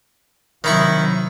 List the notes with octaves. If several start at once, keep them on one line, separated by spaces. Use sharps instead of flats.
C3 D#3 F#3 E4 C#6